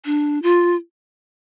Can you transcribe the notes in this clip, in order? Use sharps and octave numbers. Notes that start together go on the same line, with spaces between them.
D4
F4